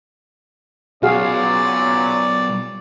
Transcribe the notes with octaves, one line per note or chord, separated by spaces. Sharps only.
B1 A#2 C#3 F#3 F#4 G#4 D5 F5